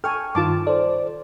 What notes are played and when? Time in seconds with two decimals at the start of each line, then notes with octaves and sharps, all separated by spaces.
0.04 A4 G5 G#5 C#6 F6
0.35 G2 D#3 F4 A5 D6
0.67 A4 C5 D5